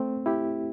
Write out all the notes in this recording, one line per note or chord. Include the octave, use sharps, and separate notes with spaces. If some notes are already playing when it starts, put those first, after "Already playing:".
Already playing: A3 C4
E4 G4